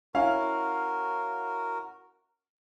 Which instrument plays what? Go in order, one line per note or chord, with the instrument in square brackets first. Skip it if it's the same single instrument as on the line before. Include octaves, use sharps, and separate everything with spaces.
[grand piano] C#4 E4 F5 [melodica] F#4 A#4